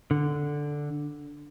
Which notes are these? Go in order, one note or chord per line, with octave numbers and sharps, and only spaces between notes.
D3